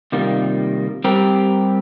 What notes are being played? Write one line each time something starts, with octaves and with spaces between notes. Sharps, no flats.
C3 D#3 G3 A#3 F4
G3 C4 G4 A#4